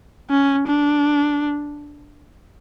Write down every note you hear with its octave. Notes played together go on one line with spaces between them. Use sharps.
C#4
D4